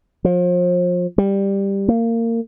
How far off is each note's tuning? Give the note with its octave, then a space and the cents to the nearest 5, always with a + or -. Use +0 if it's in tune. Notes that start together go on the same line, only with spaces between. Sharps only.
F3 +35
G3 +10
A#3 -25